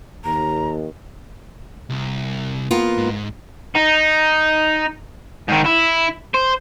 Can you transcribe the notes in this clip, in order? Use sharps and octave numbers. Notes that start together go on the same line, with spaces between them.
D#2 A#5
C2
A#3 B3 F4
G#2
D#4
G#2 D#3
E4
C5